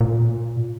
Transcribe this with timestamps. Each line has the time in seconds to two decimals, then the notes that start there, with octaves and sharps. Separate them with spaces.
0.01 A#2